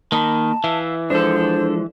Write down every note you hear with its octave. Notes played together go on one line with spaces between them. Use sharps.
D#3 A#3 D#5 A5 B5
E3 E5 F5
F3 G#3 D4 A4 C5